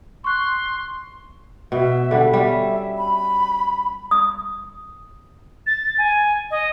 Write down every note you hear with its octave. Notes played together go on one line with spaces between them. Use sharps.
C6 C#6 F#6
B2 E5
D3 G3
G3 C#4 E5
B5
D#6
A6
G#5
D#5